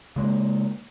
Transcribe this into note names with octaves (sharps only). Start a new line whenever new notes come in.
C#3 G#3 A#3